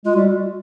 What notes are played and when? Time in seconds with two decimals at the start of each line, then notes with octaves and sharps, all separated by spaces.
0.05 G#3 F4
0.14 G3 F#4